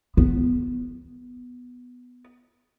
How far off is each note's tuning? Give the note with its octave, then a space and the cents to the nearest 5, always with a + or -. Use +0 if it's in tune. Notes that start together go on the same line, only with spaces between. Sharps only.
B3 +0